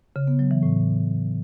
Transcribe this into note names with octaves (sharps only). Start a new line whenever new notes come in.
C#3
B3
F#3
E3
A2